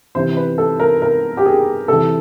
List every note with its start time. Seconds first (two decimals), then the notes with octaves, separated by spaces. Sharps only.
0.15 C3 E3 C5
0.37 B4
0.58 A4
0.80 A#4
1.02 A#4
1.37 G4
1.45 G#4
1.88 C3 E3 A4